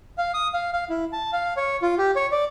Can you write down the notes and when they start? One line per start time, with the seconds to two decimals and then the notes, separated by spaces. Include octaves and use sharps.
0.18 F5
0.34 D#6
0.54 F5
0.73 F5
0.90 E4
1.13 A5
1.33 F5
1.57 C#5
1.82 F4
1.98 G4
2.16 C#5
2.32 D5